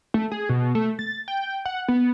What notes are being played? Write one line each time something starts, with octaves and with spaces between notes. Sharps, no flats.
A3
G#4
B2
A3
A6
G5
F#5
B3